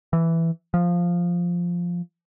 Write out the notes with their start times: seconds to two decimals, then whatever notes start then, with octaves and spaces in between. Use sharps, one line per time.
0.13 E3
0.74 F3